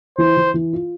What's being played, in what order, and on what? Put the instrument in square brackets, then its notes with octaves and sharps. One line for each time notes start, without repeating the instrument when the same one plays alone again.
[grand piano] E3 [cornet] C5
[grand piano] E3
E3
F4